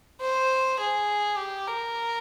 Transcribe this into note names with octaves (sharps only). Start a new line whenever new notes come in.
C5
G#4
G4
A#4